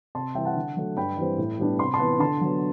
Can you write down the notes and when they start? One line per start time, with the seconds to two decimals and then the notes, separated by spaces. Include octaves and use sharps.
0.15 C3 A5 C6
0.35 E3 G3 E5 G5
0.45 F#5 A5
0.56 D3
0.77 F#3 A3
0.97 G2 G5 B5
1.17 E3 G3 C4
1.38 A2
1.59 G3 B3 D4
1.79 C3 C6
1.86 B5
1.94 A5 C6
1.99 E3 B3
2.20 D3 A5 C6
2.41 F#3 B3